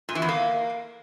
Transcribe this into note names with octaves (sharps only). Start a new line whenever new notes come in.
A#2
E3
E2
A#3